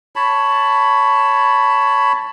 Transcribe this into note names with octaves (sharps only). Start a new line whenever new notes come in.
C#5 A5 B5